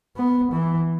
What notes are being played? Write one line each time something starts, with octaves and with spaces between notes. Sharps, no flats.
B3
E3